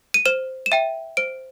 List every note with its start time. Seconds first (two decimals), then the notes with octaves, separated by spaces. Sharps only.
0.14 D#7
0.26 C5 E7
0.66 E7
0.72 E5 G5 D#7
1.17 C5 D7